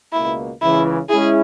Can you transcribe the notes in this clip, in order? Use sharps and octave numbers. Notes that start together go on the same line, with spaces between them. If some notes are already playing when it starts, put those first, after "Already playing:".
C#2 B2 A#3 E4
C#2 C#3 E3 E4
G#3 C#4 E4 G#4